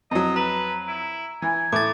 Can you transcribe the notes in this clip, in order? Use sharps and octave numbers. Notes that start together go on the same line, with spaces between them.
F2 F#3 D#5
B4 A#5
E4
E3 G#5
A2 D6 A6